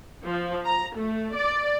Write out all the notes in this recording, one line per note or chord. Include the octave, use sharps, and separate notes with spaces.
F3
A#5
A3
D5